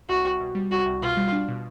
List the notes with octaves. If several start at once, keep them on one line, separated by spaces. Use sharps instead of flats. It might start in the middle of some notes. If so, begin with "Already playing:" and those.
C2 F#4
C2
B2
G3
C2 F#4
C2
B2 F4
G3
D4
B2